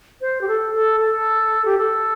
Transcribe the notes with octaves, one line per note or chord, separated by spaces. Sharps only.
C5
G4
A4
A4
A4
G4
A4